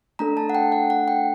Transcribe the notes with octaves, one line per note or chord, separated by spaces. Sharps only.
A3 D4 A4 A#5
A5
F#5
G5
F#5
F#5
G5